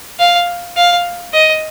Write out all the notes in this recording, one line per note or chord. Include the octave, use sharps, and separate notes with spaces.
F5
F5
D#5